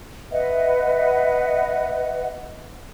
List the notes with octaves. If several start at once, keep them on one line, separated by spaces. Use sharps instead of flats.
B4 D#5 E5 F#5